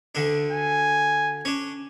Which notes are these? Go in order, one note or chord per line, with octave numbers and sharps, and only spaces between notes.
D2 D3 D4
G#5
C#4 D4